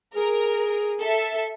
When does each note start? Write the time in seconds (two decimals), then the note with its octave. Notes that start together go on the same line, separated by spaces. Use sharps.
0.15 G#4 A#4
1.01 A4 E5